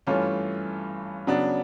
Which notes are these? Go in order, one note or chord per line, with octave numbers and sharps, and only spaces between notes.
G2 E3 A3 C#4 F4
C#3 F#3 B3 D4